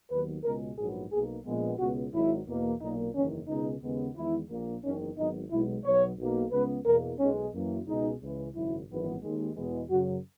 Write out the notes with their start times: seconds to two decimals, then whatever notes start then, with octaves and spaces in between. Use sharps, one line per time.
0.11 D#2 D#3 F#3 B3 B4
0.44 C#2 B2 G#3 A#4
0.77 A#1 G#2 F#3 B3 G#4
1.12 B1 B2 A#3 G#4
1.45 A#1 A#2 G#3 B3
1.79 C#2 B2 G#3 B3 F#4
2.13 G#1 G#2 F#3 E4
2.47 E2 B2 A#3
2.80 B1 A#2 A#3 D#4
3.15 F#1 E2 D#3 C#4
3.48 C#2 B2 G#3 D#4
3.82 D#2 C#3 G#3 B3
4.15 E2 D#3 G#3 B3 E4
4.49 A#1 A#2 A#3
4.83 F#1 E2 D#3 C#4
5.16 G#1 G#2 F#3 B3 D#4
5.50 B1 B2 G#3 B3 E4
5.85 B1 B2 F#3 B3 C#5
6.18 B1 B2 A#3
6.52 C#2 C#3 G#3 B3 B4
6.86 E2 B2 A#3 A#4
7.19 B1 B2 G#3 C#4
7.53 F#2 E3 A#3
7.87 C#2 B2 G#3 D#4
8.21 C#2 C#3 E3
8.54 G#1 F#2 C#3 F#3 E4
8.89 G#1 F#2 E3 B3
9.22 D#2 D#3 G#3
9.55 E2 B2 G#3 B3
9.90 F#2 C#3 F#3 F#4